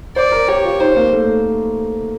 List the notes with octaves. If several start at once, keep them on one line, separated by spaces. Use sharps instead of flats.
C5 D5
A#4
G4 C#5
F4
D#4 C5
A#3
A3